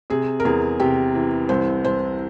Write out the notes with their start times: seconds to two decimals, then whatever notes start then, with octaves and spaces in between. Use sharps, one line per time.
0.10 C3 G#4
0.40 A#4
0.45 E2 G#4
0.80 C3 G4
1.15 E3
1.49 C2 C5
1.85 C2 C5